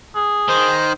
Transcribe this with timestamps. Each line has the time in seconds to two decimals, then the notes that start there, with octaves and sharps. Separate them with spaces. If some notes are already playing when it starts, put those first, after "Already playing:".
0.15 G#4
0.49 D#3 C5